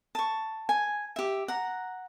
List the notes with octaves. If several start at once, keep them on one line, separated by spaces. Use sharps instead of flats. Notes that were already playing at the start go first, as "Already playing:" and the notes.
A5 C#6
G#5
G4 E5
F#5 A#5